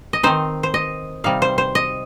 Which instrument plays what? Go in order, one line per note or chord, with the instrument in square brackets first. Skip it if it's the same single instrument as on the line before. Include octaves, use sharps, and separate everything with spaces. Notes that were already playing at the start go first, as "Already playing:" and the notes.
[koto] D#5
D#3 C4 D#4 C5
C5
D#5
C3 G3 D#4 F5
C5
C5
D#5